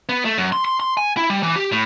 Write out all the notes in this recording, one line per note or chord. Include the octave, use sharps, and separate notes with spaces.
B3
A3
F#2
C6
C6
C6
G#5
E4
G3
E3
G4
A2